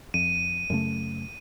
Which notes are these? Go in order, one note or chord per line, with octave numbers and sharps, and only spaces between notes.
F2 D#7
F#2 C#3 A3